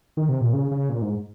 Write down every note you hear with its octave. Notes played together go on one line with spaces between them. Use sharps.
D#3
C3
A#2
C#3
C#3
A#2
G#2